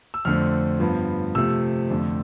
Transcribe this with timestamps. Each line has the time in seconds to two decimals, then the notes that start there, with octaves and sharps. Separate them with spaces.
0.14 E6
0.25 F2 D3 A3 C4 F6
0.80 G2 F3 B3
1.35 C3 F3 A3 E6
1.90 F2 D3 A3